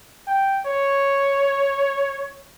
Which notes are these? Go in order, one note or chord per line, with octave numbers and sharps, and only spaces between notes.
G5
C#5